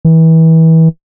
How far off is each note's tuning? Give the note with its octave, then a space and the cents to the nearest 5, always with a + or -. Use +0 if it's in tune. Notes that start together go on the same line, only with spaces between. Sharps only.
E3 -30